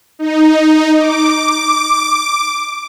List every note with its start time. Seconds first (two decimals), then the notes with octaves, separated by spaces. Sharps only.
0.19 D#4
0.99 D6